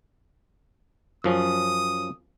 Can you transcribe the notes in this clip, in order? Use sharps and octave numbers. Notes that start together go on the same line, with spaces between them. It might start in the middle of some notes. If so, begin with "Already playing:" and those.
F#2 F3 C#4 D#6